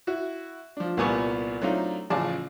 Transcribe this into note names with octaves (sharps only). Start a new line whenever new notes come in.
E4 F#4
F3 D4
C2 A#2 G3 B3 G#5 C#6
F#3 A3 C4 D4 D#4 F4
A1 C#3 F3 G#4 D5 A5